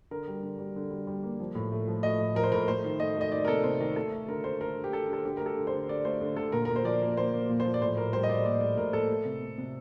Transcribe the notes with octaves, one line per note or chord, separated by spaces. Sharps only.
D3 A#4
G3
D3
G3
D3
G3
G3
A#3
F3
A2
A3
F3
A3 D#5
A2
F3 A#4
C5
A2 A#4
A3 C5
D#3
A3 D#5
A3
D#5
D#3 D5
A#4
C3 A4
C3 C5
D#3 A#4
A3 A4
A3
D3 A#4
A3 C5
D3 A#4
D3
G4
D3 A4
D3 A4
D3 G4
A3 A#4
A4
D3
C5
D3
D3 D5
A3 C5
D3
D3 A4
A#2 A#4
A#2 A#4
C5
F3 D5
A#3
A#3 C5
A#3
A#2
F3 C5
D5
A2 C5
A2 A#4
G3 C5
D#5
A2 D5
A#3 D5
A2 D5
A2 A#4
A#3 A4
A3
C3
C3
C3